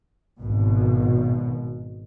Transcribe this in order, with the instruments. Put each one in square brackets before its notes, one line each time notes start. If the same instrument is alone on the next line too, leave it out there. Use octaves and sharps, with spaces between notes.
[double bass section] G#1 B2